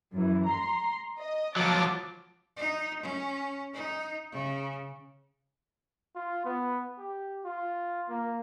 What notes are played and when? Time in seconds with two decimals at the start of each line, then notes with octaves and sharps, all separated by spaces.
0.12 F#2 E3
0.45 A#5 C6
1.19 D#5
1.56 F3 F#3 D6 A6
2.56 D#4
3.02 C#4
3.73 D#4
4.32 C#3
6.16 F4
6.45 B3
6.99 G4
7.45 F4
8.09 A#3